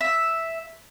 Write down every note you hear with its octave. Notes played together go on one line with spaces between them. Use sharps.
E5